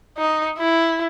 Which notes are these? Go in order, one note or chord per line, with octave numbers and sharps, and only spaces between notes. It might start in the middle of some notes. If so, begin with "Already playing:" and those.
D#4
E4